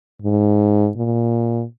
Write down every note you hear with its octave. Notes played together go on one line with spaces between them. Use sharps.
G#2
A#2